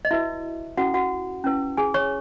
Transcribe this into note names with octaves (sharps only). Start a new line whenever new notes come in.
D#5
E4 F#4 B4 E5
C#4 E4 F#4 A4 F#5
F#4 F#5
C#4 E4 B4
G#4 G#5
C#5 C#6